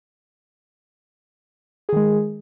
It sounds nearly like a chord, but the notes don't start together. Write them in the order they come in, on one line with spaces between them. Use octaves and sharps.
G#4 D#3 G#3